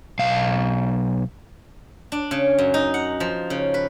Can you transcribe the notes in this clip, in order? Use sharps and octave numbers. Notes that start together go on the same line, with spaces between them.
B1 F5
D4
C#3
F#2
D#4
F#5
F3
C#3
B4